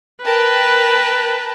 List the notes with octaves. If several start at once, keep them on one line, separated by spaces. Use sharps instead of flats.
A#4 B4 G5 A5